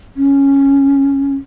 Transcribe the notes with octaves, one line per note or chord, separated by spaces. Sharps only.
C#4